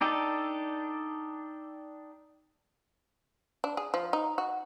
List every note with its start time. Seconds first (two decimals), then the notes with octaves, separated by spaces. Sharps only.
0.01 D4 D#4 G4 A4
3.64 D4
3.77 G#4
3.94 F3
4.13 D#4
4.38 F#4